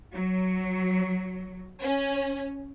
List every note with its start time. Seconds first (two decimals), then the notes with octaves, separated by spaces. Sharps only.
0.14 F#3
1.81 C#4